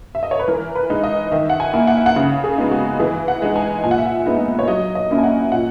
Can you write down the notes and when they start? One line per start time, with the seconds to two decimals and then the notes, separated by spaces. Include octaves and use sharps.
0.15 E5
0.23 D#5
0.31 C#5
0.39 B4
0.48 E3 A#4
0.76 B4
0.90 G#3 D#4
1.04 D#5
1.32 D#3 E5
1.50 F#5
1.60 G#5
1.74 A#3 E4
1.87 F#5
1.97 E5
2.06 F#5
2.16 C#3
2.44 G#4
2.58 G#3 B3 D#4
2.71 F#4
2.99 E3 G#4
3.28 F#5
3.42 G#3 D#4
3.56 G#5
3.84 A#2 G#5
3.91 F#5
3.98 E5
4.06 F#5
4.26 G#3 B3 D#4
4.59 C#5
4.68 F#3 D#5
4.95 D#5
5.10 A#3 C#4 E4
5.18 G#5
5.24 F#5
5.52 A#2 F#5